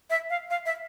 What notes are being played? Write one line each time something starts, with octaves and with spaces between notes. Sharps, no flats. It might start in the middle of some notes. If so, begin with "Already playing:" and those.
E5
F5
F5
E5